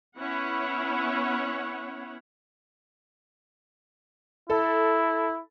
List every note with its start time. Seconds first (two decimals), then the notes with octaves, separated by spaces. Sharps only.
0.18 B3 C#4 E4 C#5 F#5
4.50 E4 A4